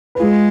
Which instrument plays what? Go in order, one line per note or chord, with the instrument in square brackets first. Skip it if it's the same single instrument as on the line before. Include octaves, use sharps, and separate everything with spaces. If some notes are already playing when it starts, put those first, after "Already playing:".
[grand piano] B4
[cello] G#3 [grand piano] F4 G#4